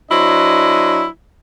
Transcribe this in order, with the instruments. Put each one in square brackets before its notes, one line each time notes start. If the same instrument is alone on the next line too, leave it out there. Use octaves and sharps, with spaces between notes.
[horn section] F#3 D4 E4 C5 D#5